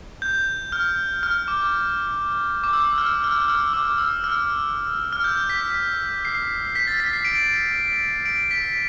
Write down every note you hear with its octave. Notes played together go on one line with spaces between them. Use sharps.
G6
F6
F6
D6
D6
E6
F6
F6
F6
E6
D6
E6
F6
F6
G6
B6
C7
B6
A6
B6
C7
D7
D7
B6